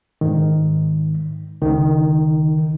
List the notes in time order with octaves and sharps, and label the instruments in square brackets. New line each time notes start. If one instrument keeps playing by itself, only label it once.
[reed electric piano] G#2 D#3
[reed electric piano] C#2 [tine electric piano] D#3